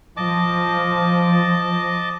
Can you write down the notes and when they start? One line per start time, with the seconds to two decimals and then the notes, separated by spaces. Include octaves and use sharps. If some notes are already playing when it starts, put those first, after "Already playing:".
0.17 F3 D#5 A5 D6